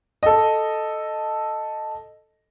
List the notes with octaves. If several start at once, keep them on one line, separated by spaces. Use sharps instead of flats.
A4 D#5